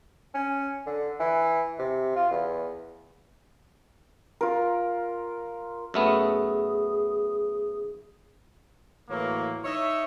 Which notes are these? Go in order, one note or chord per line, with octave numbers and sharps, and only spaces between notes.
C#4
D3
E3
C3
F4
E2
F4 A#4
F#2 A3 B3 G#4
A2 E3 F#3 A#3
D#4 C#5 E5